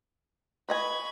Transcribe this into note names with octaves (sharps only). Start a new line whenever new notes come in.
B4 D#5 G#5 B5 C#6